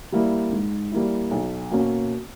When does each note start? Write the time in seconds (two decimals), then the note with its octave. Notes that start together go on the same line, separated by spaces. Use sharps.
0.12 G3 A#3 E4
0.52 G#2
0.92 G3 A#3 E4
1.31 B1
1.71 B2 A#3 C#4